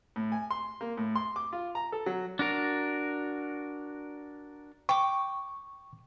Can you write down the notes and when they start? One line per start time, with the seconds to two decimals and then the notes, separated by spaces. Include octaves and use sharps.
0.16 A2
0.32 G#5
0.51 C6
0.81 A#3
0.97 A2
1.15 C6
1.36 D6
1.53 F4
1.75 A#5
1.92 A4
2.06 F#3
2.39 D4 F#4 A#4
4.89 G5 C#6 D6